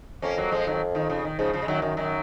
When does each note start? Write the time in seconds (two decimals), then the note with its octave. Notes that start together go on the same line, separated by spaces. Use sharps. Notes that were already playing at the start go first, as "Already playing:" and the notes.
0.22 F2 A#3 C#4
0.37 F#3 A#3
0.52 F3 G#3
0.67 D#3 F#3
0.95 D#3
1.10 C#3 F3
1.25 D#3
1.39 G#2 C#3 F3
1.53 C#3 F3
1.62 G#3
1.68 F#2 D#3 F#3
1.82 F#2 D#3
1.97 F#2 D#3 F#3